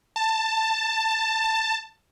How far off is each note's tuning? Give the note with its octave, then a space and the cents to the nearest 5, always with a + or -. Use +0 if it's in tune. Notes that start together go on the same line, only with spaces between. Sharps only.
A5 +15